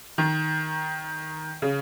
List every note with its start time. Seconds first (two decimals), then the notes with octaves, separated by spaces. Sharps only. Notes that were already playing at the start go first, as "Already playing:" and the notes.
0.18 D#3
1.62 C#3